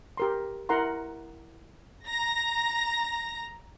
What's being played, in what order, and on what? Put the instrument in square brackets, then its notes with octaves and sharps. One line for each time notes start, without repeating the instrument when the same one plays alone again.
[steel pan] G4 A#4 C6
E4 A#4 F#5 A#5 C6
[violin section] A#5 A#6